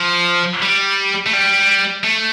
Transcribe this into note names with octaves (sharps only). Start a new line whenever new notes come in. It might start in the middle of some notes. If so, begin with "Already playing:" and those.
Already playing: F3
G3
A3
G3
A3